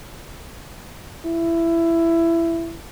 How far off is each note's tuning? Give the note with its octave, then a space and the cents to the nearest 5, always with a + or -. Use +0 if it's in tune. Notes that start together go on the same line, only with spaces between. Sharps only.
E4 +15